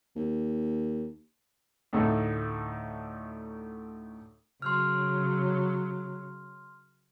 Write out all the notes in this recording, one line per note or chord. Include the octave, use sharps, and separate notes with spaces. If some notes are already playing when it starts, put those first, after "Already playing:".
D#2
D2 A2 A3 D#4
C#3 F#3 C6 F6